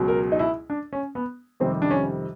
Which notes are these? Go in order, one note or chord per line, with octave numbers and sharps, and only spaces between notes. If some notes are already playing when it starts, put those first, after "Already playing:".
Already playing: C#2 B2 F#3
A#4
D#4
E4
D4
C#4
B3
F2 C3 D#3 G3 C4
D4
C#4